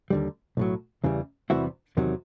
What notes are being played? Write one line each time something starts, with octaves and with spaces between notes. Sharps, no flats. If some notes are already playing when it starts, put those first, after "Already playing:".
D#2 D3 G3
B1 A2 F#3
E2 C#3 E3 G3
E2 C3 E3 G3 E4 F#4
E2 C3 D#3 F#3